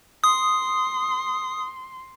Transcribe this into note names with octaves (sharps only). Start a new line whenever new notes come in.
C6 D#6